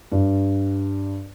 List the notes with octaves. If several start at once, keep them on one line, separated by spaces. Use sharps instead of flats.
G2